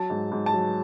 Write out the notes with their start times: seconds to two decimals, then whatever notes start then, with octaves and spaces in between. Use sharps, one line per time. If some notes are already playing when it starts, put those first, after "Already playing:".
Already playing: F#3 A5
0.10 G#2
0.32 G#2
0.46 A5
0.54 F#3